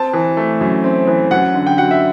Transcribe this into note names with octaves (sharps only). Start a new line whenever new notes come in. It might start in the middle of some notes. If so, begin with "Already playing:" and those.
Already playing: C4 A5
E3
A3
F#2
C4
E3
F#2 F#5
D3
G5
F#3 F#5
E5